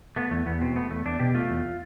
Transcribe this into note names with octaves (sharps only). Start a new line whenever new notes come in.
A3 B3
E2 A3
E2 B3
B2 C4
A3 B3
E2 A3
E2 D4
B2 G4
A3 F4
E2